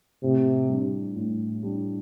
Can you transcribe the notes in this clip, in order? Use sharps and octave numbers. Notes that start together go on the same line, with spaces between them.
A2 C3
G3 D4
A2
G3 D4